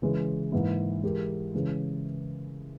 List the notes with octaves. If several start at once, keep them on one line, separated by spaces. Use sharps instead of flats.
C#3 E3 G#3
G#2 E3 A#3 E4
E3 G#3 E4 G4 A#4
C#3 E3 G#3